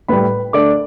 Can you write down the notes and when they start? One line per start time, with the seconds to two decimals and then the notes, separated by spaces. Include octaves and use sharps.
0.08 A2 G3 B4 B5
0.53 D3 A3 D5 D6